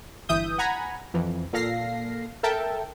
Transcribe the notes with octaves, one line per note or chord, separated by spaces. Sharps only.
G1 E3 E5 D#6 G6
F#5 G#5 A#5 B5
F2 E3
A#2 A4 F5 A#6 C7
A4 A#4 E5 G5 A5